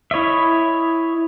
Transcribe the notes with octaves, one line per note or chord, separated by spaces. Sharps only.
E4 C#5 D#5 E5